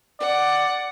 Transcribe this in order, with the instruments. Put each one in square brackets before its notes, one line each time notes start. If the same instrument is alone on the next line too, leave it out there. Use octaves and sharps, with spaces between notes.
[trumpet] D5 [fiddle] F#5